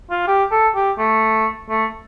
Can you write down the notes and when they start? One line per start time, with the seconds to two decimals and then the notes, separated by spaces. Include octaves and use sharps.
0.10 F4
0.28 G4
0.52 A4
0.75 G4
0.98 A3
1.69 A3